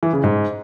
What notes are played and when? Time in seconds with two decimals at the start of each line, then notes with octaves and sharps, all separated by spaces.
0.03 E3
0.13 C#3
0.23 G#2